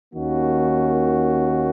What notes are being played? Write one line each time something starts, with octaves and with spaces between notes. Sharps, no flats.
D#2 D#3 A#3 C#4 F#4